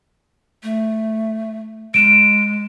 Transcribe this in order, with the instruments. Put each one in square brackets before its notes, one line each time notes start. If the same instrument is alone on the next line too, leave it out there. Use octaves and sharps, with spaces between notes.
[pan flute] A3
[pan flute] G#3 [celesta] D7 E7